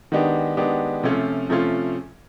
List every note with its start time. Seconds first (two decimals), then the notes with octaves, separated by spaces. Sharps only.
0.12 D#3 G#3 B3 D4 G4
0.57 D#3 G#3 B3 D4 G4
1.03 C3 F3 A3 C#4 F4
1.49 C3 F3 A3 C#4 F4